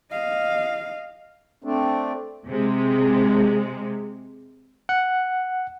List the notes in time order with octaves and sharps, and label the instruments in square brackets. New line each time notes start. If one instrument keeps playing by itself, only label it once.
[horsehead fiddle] D#5 F5
[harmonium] A3 C4 D4
[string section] C3 G#3
[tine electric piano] F#5